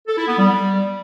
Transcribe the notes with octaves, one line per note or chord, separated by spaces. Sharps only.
A4
E4
B3
G3